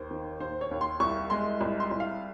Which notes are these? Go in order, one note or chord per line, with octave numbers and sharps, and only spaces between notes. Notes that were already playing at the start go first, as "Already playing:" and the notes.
Already playing: D#2 C5
D#3
D#2 C5
C#5
D#2
C6
C2 C#6
G#3 C6
C2
C6
C2
F5